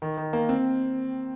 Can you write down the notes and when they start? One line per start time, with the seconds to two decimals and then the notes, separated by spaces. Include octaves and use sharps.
0.02 D#3
0.17 D#3
0.33 A#3
0.49 C4